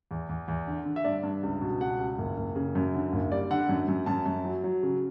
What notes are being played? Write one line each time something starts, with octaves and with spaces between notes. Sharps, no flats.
E2
E2
E2
D3
D3
E5
G2 D5
G2
C#2
B2
C#2 F#5
C#2
F#1
F#1
C#3
F#2
D3
F#1
G3 D5
D3 F#5
F#2
F#2
F#2 A5
F#2
F#3
F#3
C#3